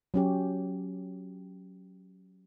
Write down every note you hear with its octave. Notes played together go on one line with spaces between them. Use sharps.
F#3 C#4 G4